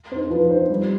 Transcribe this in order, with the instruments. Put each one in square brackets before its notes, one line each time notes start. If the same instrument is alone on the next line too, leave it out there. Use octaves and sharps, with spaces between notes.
[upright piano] C4 C5
D#4
F3 B4
C4 D#4 C5
G3